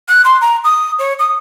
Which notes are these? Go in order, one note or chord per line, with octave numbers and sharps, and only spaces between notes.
F#6
C6
A#5
D#6
C#5
D#6